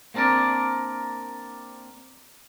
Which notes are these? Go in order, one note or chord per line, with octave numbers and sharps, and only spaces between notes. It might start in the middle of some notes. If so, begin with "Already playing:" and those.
A#3 C4 D4 A#4 D5